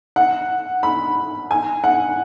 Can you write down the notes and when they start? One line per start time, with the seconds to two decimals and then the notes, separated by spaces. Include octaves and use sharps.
0.16 F#5
0.83 B5
1.51 G#5
1.84 F#5